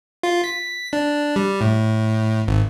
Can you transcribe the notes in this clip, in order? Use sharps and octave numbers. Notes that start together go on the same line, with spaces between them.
F4
B6
D4
G3
A2
G#1